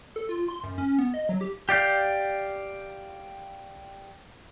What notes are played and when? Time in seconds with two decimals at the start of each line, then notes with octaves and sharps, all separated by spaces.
0.16 A4
0.29 F4
0.48 C6
0.64 F#2
0.78 C#4
0.99 B3
1.14 D#5
1.29 F#3
1.41 G4
1.69 G4 D5 F5 G6